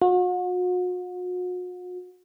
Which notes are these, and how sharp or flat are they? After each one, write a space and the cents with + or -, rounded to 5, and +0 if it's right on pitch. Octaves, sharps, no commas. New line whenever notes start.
F#4 -40